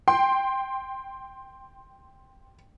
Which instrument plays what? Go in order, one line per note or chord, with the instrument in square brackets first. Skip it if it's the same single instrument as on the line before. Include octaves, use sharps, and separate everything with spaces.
[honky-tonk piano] G5 C6